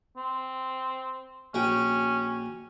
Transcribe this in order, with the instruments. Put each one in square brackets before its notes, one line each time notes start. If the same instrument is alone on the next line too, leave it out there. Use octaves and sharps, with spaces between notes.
[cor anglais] C4
[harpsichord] A#1 F#4 G5 [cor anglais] C#4